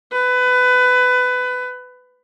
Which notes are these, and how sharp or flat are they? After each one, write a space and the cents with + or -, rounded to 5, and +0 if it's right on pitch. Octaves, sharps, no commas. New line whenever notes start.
B4 +20